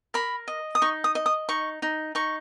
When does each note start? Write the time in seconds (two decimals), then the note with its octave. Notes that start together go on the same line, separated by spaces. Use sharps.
0.14 A#4 B5
0.48 D#5
0.75 D#6
0.82 D#4 C#6
1.04 D#6
1.15 D#5
1.26 D#6
1.49 D#4 C#6
1.82 D#4
2.15 D#4 C#6